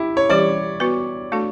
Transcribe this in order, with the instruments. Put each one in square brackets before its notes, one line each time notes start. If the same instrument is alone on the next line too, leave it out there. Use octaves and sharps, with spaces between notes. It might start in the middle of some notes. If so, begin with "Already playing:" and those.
Already playing: [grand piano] E4 G4
C#5
[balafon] E3 G3 C#4 G4 [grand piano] D5
[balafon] B3 F#4 B4
A3 D4 F#4 A4